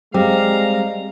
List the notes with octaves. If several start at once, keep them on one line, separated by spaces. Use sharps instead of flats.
G3 G#3 C4 G4 F5 A#5